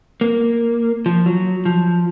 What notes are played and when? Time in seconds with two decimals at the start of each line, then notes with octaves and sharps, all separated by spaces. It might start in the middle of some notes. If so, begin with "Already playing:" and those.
0.21 A#3
1.06 F3
1.26 F#3
1.65 F3